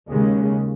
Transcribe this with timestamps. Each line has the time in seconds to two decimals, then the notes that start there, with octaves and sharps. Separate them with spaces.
0.09 D#2 C#3 G#3